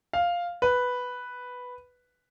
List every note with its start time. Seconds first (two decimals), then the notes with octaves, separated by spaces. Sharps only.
0.13 F5
0.62 B4